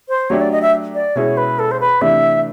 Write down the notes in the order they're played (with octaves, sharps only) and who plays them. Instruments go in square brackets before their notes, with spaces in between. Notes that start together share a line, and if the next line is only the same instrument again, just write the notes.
[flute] C5
[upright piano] F#3 A3 D4 G4 [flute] C#5
[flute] D5
D#5
E5
D5
[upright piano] B2 G#3 C#4 E4 G#4 [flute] C#5
[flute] B4
A4
C5
B4
[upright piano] C3 E3 A3 D4 [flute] E5